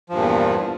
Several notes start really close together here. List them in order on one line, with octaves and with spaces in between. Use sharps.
F3 G2 A#2 E2